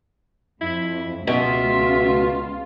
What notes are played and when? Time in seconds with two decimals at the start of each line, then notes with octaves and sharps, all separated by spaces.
0.61 F2 E4
1.27 C#2 B2 F4 E5